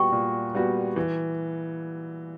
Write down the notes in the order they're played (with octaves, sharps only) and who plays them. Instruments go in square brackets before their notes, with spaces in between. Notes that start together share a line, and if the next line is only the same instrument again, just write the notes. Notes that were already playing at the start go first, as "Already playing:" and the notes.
Already playing: [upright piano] A#2 G3 B3 F#4 [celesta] G5 C#6
[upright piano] A#2
G3 B3 F#4
E3